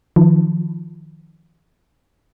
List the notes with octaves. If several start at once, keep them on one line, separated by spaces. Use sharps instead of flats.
D#3 F3